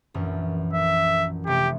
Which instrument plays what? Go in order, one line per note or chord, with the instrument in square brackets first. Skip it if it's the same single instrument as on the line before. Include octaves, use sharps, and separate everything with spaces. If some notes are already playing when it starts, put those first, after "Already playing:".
[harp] A#1 F#2 E3
[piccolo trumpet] E5
[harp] F1 A3 [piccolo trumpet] G4